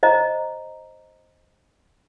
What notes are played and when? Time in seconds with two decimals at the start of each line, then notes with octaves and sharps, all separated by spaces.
0.03 C5 D#5 A#5